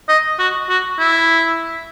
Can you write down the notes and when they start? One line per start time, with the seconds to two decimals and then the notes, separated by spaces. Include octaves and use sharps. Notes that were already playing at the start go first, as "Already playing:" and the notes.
0.09 D#5
0.39 F#4
0.69 F#4
0.99 E4